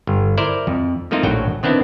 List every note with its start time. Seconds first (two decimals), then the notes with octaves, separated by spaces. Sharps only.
0.07 G1
0.37 E4 A#4 C5 D5
0.67 F2
1.11 F3 A3 A#3 C4 D#4 F4
1.23 A#1 A2 F#3 F#4 G5
1.63 D#3 B3 C4 D4 E4